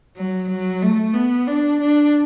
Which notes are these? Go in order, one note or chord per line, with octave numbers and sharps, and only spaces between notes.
F#3
F#3
A3
B3
D4
D4